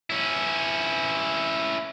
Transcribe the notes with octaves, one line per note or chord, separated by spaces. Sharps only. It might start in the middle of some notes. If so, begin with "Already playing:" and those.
C#4 E4